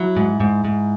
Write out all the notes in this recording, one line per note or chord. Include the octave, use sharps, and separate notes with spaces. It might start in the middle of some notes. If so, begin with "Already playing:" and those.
Already playing: F#3 E4
G#2
G#2
G#2